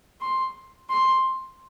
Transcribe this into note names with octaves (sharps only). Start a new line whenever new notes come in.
C6
C6